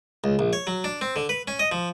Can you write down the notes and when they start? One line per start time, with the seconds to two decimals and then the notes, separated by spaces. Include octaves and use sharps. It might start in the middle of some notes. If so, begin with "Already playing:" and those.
0.24 C#2
0.39 A#1
0.53 C#5
0.67 F#3
0.84 D4
1.01 C4
1.16 D3
1.29 B4
1.48 C#4
1.59 D#5
1.72 F3